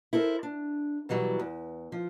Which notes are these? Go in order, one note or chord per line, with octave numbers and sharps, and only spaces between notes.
E4 A4 A#4 C5
D4
B2 E3 F#3 G3
E2
F3